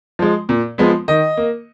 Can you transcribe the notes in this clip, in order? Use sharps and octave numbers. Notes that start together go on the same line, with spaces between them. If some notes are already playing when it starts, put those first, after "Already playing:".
F3 G#3
A#2
F3 G#3 B3
D#3 D#5
A#3